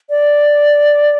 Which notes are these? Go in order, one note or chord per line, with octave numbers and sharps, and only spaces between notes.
D5